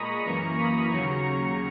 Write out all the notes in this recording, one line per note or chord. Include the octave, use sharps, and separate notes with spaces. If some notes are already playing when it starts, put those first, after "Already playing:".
Already playing: A#2 G#3 A#5 B5 C#6 D#6
F#2 E3 A#3 A#5 C#6
B5 D#6
D#2 C#3 F#3 A#5 C#6
A#5 C#6